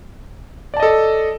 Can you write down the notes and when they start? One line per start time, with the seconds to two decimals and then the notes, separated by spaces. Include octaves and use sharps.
0.74 D5
0.77 A5
0.80 D#5
0.83 A4